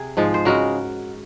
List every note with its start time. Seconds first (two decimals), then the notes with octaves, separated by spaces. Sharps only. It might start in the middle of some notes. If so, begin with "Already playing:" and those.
Already playing: C3 G#4
0.17 G#2 F3 G#3
0.34 C5
0.45 C#3 G#3 F#4 A#4